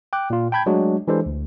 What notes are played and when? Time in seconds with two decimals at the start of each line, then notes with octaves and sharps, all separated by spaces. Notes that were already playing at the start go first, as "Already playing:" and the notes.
0.13 G5 D6 F#6
0.30 A#2 F4
0.52 G5 A5 B5 G6 G#6
0.66 F#3 G#3 A3 D4 F#4
1.08 E3 G#3 D4 G4 A4 C5
1.26 D2